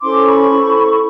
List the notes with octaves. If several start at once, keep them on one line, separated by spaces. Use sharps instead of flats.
C#4 E4 A4 C5 C6 D6
B5 C#6
E4 A4 C5